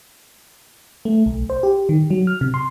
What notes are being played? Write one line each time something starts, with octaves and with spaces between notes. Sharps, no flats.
A3
B1
C5
G4
D#3
F#3
F6
C3
C6